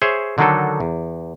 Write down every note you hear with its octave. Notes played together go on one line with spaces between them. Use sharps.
G#4 C5 C#5 E5
D3 D#3 F#3 D4 D#4 A4
E2